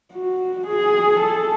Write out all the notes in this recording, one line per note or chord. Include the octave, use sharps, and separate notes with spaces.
F#4
G#4
A4